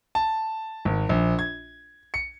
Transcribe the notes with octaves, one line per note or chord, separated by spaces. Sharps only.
A5
G#1
A#1
G#6
C#7